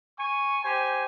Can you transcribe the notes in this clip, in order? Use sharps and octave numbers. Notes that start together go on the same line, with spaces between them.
G#5 C#6
G4 C5 G#5